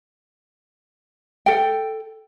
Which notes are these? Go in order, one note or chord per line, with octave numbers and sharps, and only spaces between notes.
A4 G5